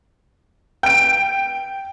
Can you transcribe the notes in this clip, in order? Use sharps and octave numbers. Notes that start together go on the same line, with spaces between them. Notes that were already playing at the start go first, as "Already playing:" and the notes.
G5 D7